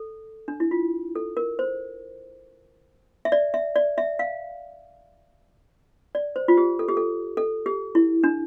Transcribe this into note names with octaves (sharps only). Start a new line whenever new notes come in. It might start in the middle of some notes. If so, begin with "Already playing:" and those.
Already playing: A4
D4
E4
F4
A4
A#4
C5
E5
D5
E5
D5
E5
F5
D5
C5
F4
G4
A4
G4
A4
A4
G4
E4
D4